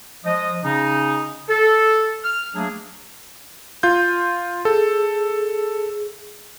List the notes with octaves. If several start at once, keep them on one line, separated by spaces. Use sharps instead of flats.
F3 G#3 D#5
C#3 C#4 D#4
A4
F6
F#3 A3 A#3 D4 G#4
F4 G6
G#4 A4